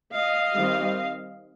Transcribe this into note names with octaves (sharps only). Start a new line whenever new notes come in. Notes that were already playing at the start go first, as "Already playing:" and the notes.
D#5 F5
D#3 G3 C4